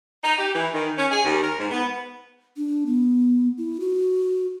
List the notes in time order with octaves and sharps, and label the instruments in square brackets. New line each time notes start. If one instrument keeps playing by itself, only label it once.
[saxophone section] D#4
G4
E3
D#3
C#4
G#4
D#2
A#4
G#2
B3
[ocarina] D4
B3
E4
F#4